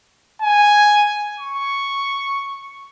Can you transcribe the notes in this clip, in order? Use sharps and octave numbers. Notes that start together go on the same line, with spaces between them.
G#5
C#6